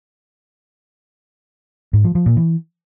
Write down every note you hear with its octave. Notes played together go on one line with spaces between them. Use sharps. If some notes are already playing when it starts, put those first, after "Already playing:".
G#2
F3
F3
A#2
E3